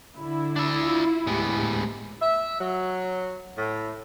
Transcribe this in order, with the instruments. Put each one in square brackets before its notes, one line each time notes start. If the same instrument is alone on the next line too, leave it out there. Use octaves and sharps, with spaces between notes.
[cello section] D3 [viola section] E4
[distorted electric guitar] D4 E5
[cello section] F4
[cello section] D2 A2 G4 [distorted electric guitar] G#3 B3
[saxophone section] E5
F#3
A2